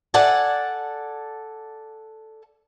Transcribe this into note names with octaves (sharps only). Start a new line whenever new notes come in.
A4 D5 F#5 G#5 A5